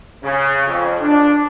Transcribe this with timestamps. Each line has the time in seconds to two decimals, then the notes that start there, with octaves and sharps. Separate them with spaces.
0.23 C#3
0.67 F2
1.00 D4